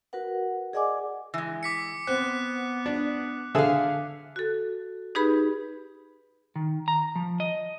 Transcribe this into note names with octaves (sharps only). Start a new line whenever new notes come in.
F#4 A#4 B4 F#5
G#4 D5 D#5 F#5 G#5 D6
E3 G#3
D6 B6 C#7
B3 C4 C5 F#6
D4
D3 G#4 A4 E5 F5
F#4 A4
D#4 G4 G#4 B4 B5
D#3
A#5
F3
D#5